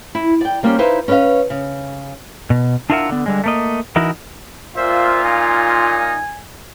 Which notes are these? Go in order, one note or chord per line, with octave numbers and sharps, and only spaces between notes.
E4
D5 G5
G3 A#3 C4 C#4 G4
D#4 E4 B4 C5 F5
C#4 A#4 B4 D#5 F5
C#3
B2
D4 E4 F4 A#4 E5 F#5
D3 B3
D3 G3 G#3
A3 A#3 D#5
E3 D#4 E4 F#4 A#4
A#2 F4 C5 E5
D#4 G#5